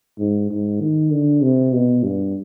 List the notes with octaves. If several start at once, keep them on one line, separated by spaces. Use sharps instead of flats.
G#2
G#2
D#3
D3
C3
B2
G2